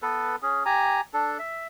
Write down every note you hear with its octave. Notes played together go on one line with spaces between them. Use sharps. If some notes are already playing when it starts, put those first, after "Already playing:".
B3 A4 B4
C#4 G#4
G4 G#5 A#5
D4 A4
E5